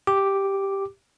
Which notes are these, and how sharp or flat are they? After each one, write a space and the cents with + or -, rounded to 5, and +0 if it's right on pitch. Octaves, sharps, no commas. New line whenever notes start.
G4 +0 D6 +0